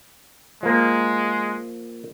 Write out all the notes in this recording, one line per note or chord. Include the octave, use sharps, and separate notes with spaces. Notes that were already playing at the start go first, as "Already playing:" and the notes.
F3 G#3 A#3